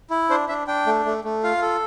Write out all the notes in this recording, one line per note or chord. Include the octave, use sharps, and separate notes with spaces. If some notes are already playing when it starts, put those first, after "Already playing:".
E4
D4 C5
D4 E5
D4 G5
A3
A3
A3
F4 F5
A4